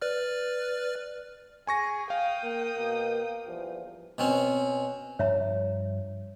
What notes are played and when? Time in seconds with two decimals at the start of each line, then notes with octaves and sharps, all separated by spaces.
0.01 B4 D5 F6
1.67 G#4 G#5 C#6 A#6
2.10 F5 G5 D#6
2.42 A#3
2.76 B2 A#3
3.47 E2 G2 F3
4.18 B2 C4 C#4
5.19 G2 F3 C#5 E5 A#5